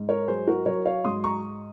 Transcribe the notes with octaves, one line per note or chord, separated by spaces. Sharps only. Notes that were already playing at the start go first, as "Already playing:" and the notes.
Already playing: G#2
A#4 C#5
F#3 G#4 C5
F#4 A#4
F#3 A#4 C#5
C#5 F5
G#2 C6 D#6
A#5 C#6